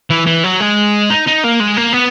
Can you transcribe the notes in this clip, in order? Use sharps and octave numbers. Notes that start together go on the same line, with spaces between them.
E3
E3
F#3
G#3
D#4
D#4
A#3
G#3
A#3
B3